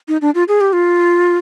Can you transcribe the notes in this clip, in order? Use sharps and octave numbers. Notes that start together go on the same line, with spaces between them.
D#4
D4
F4
G#4
G4
F4